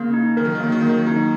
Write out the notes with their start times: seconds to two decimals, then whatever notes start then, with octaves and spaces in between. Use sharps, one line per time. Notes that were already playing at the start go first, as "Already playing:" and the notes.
Already playing: C#3 A#3
0.14 D#4
0.37 D#3 A#4
0.45 F#3
0.55 D#3
0.60 F#3 A#3
0.72 D#3
0.81 F#3 A#3
0.89 D#3
0.98 F#3
1.06 D#3 D#4
1.16 F#3